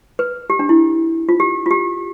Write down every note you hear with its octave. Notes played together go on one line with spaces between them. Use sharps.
B4
G4
D4
E4
F4
G4
F4
G4